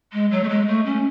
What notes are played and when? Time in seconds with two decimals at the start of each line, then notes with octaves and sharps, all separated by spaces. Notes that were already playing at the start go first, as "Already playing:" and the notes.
0.12 G#3
0.31 F#3
0.43 A3
0.49 G#3
0.67 A3
0.85 C#4